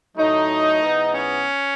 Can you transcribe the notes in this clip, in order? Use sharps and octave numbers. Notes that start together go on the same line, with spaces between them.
A2 F#3 A3 D#4
G#2 E3 B3
C#4